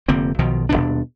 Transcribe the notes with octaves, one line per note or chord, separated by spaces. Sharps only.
F1 D3 A#3 C4
B1 B2 D#3 F3
D#1 C2 B2 D4